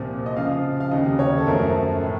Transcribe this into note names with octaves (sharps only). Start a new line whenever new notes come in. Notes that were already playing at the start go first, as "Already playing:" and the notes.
Already playing: C2 A#2 F3 C4
D#5
F2 C#3 F3 F5
F5
F1 D#2 C#3 D#5
C#5
A4
F#2 F3 A3 C4 A#4
A2